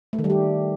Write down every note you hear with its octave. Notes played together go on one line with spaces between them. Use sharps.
A3
D#3
G3
G4